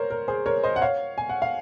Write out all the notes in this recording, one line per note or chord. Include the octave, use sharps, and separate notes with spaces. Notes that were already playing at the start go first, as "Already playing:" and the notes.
Already playing: A#4 C5 C#5
A#4
G#4 C5
A#4 C#5
C5 D#5
F#5
C#5 F5
G#5
F#5
F5